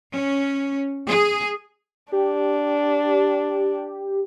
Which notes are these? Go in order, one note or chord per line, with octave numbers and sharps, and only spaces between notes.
C#4
G#4
D4 G4